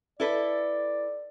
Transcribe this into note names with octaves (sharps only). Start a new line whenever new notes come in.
E4 A4 B4 D5